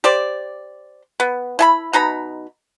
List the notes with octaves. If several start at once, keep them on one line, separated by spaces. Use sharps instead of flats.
G4 C5 D5
B3
E4 G#5 B5
B2 D#4 A#5 B5